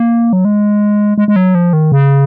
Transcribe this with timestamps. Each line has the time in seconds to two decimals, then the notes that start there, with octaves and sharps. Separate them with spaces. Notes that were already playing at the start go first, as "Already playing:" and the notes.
Already playing: A#3
0.33 F#3
0.45 G#3
1.18 G#3
1.28 G#3
1.36 F#3
1.55 F3
1.73 D#3
1.92 C#3